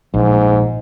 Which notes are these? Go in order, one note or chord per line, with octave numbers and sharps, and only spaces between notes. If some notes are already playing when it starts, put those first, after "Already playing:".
A#1 G#2